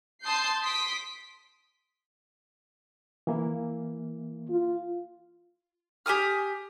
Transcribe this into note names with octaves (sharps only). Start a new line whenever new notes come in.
A5 C6 D#6 G6 C7
C6 D#6 B6 D7
E3 A#3 E4
F4
G4 G#5 D#6 F6